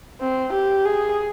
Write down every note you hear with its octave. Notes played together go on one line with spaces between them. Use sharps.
C4
G4
G#4